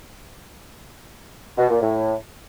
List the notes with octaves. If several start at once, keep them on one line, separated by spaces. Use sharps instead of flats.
B2
A#2
A2